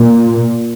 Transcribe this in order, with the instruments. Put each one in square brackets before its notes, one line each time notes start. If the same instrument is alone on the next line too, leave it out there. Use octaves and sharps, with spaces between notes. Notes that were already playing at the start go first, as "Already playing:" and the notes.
Already playing: [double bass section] A#2